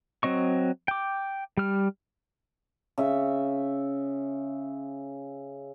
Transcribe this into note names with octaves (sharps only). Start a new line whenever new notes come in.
F#3 C4 D#5 C#6
G5 D6
G3 F6
C#3 E5